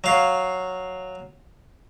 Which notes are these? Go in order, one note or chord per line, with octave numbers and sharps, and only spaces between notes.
F#3 F5